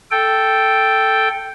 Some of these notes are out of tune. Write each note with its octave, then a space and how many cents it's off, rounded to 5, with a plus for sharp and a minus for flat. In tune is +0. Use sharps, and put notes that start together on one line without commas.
A4 +0 G5 +0